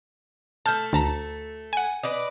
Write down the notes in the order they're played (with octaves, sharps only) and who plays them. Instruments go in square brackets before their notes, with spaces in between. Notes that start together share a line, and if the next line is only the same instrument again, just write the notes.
[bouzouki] A3 A4 [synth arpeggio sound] A5 F6 G6
[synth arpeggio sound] D2 A5 A#5
F#5 G#5
[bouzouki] B4 D5 D#5